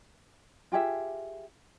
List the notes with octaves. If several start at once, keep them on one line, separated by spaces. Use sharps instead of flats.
F4 G4 G#4 E5